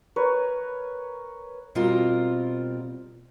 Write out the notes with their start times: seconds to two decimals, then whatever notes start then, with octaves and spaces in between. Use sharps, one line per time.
0.16 A#4 B4 C#5
1.75 B2 G3 C4 F4 A#4